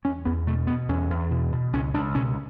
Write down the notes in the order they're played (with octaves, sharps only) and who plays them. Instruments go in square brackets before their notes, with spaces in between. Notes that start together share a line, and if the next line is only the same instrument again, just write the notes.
[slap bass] E2 C#4
E2 B3
B2 A3
B2 B3
E2 C#4
E2
B2
B2
C#2 C#4
C#2 D4
B2 C#4